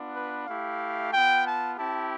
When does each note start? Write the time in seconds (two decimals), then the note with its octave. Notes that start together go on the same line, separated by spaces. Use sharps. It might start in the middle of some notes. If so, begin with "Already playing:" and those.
Already playing: B3 D4 F4
0.15 B4
0.46 A3 E4 G4 F5
1.12 B3 F4 G5
1.45 A5
1.77 C4 E4 G4 A5